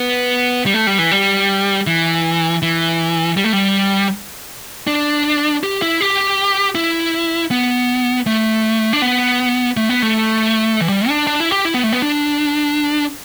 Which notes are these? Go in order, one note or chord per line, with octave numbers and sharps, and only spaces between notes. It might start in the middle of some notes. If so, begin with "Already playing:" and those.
Already playing: B3
G3
A3
G3
E3
G3
E3
E3
G3
A3
G3
D4
G4
E4
G4
E4
B3
A3
D4
B3
A3
B3
A3
E3
G3
D4
D4
E4
G4
E4
B3
A3
B3
D4